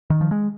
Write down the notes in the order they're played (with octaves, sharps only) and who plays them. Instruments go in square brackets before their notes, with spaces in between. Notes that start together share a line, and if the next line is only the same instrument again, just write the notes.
[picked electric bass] D#3
F3
G#3